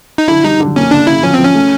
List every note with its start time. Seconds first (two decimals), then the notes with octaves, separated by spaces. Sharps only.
0.18 D#4
0.28 D3 E4
0.44 G3 D#4
0.60 D3
0.76 A#3 C#4
0.91 C#3 D4
1.07 C#3 E4
1.23 F3 C#4
1.34 C4
1.39 F3
1.45 C#4
1.55 A3